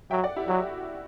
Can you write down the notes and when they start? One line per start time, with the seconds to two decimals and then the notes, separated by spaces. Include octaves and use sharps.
0.11 F#3 E5 G5
0.24 D5 F#5
0.36 E4 G4
0.48 F#3 F#4